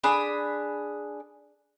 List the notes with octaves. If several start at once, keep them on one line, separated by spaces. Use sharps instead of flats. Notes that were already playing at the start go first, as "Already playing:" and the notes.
D4 G#4 B5